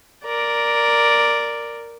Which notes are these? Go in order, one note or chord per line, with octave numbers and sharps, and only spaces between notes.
A#4 D5